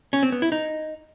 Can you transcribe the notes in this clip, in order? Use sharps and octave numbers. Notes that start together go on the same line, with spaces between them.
C#4
C4
B3
E4
D#4